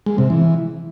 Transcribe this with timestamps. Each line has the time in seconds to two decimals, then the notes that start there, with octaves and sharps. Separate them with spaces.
0.06 G#3
0.18 C3
0.30 E3